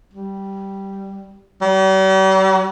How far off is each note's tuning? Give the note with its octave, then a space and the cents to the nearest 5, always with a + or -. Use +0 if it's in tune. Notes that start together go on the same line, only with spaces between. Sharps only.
G3 -5
G3 -45